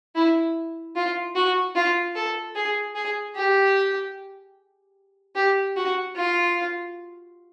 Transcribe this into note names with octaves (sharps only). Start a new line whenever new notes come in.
E4
F4
F#4
F4
A4
G#4
G#4
G4
G4
F#4
F4